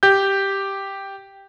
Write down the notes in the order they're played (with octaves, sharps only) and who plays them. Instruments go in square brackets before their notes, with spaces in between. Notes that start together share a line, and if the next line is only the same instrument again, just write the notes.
[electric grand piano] G4 G6